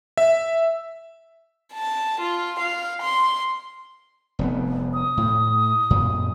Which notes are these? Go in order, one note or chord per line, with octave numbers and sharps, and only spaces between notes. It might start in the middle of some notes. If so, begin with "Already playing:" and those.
E5
A5
F4
F5
C6
F1 B2 B3
D#6
A2
F#2 A#2